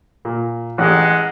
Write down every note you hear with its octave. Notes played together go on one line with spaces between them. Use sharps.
A#2
A1 G#3 G4 F#5